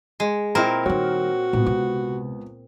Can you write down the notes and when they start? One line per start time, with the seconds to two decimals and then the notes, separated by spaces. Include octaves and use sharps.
0.20 G#3
0.55 A#2 C4 E4 A#4 D#5 A#5
0.86 D#3 G3 F#4 C#5
1.53 C#2 A2 B3
1.66 C3